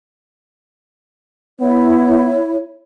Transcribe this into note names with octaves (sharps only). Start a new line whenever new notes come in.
B3 E4 C#5